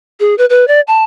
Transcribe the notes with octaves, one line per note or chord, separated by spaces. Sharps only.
G#4
B4
B4
D5
A5